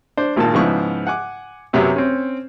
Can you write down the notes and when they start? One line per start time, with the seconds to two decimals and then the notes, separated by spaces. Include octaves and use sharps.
0.17 D4 C5
0.36 G#1 A#2 D#3 A#3 A5
0.54 G#2 C#3 F3 B3 E4 C#6
1.07 F#5 G#5 D6
1.73 F#2 C3 F#3 B3 E5 D#6
1.96 C4 C#4